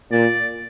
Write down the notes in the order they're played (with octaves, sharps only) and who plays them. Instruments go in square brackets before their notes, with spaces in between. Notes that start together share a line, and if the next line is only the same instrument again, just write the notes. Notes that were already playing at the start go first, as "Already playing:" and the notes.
[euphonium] A#2 [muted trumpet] D5